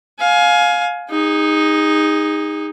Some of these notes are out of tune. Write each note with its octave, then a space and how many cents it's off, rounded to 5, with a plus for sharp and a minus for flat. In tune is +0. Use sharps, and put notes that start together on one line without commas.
F5 +15 G#5 +20
D#4 +0 G#4 -35